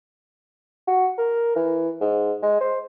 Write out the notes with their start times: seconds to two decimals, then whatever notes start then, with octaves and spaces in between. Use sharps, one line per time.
0.87 F#4
1.18 A#4
1.56 E3
2.01 G#2
2.43 G#3
2.61 C5